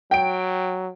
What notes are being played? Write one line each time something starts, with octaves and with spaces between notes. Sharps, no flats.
F#3 G5 D7